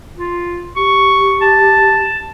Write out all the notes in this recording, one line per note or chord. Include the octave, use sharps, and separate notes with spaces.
F4
G4 C#6
A5